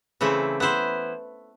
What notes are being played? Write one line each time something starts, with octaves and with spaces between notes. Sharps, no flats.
C#3 E3 A3 C4 E4
B3 E4 C5